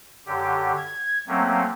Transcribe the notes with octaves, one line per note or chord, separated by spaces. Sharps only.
F#2 D3 G4
G#6
F#3 A3 A#3 C4 C#4